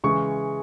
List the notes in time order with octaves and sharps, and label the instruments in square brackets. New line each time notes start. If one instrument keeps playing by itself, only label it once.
[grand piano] C#3 E3 G#3 C#6